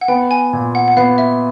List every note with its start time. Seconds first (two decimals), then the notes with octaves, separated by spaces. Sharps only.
0.01 F#5
0.08 B3 G5
0.31 G#5
0.53 A#2
0.75 F#5
0.88 F#5
0.97 B3 F5
1.18 E5